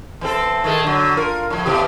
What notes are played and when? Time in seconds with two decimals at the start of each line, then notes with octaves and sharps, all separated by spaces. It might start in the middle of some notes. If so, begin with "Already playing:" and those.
0.21 E3 C4 A4
0.64 D#3 G#3 A3
0.83 D3 F#3
1.17 F4 A#4
1.50 A2 F3
1.66 B2 E3 G4